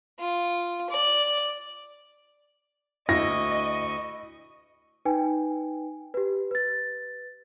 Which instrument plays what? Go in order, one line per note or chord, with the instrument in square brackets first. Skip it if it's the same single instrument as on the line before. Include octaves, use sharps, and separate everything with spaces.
[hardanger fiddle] F4
D5
[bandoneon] D2 C#6 [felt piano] E4 [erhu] D#5 [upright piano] A#6
[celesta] D#4 B4 G5 G#5
G4 B4
B4 A6